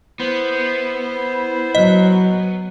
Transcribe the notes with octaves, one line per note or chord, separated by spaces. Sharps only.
B3 E4 C5
F#3 D#5